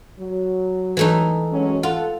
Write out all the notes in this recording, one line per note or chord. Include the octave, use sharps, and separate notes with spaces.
F#3
E3 A3 D#4
F#3 G#3 C#4
F4 A4 F#5